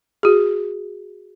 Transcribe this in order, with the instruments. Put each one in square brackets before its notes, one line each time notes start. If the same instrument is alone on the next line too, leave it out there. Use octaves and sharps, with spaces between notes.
[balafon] F#4 G#4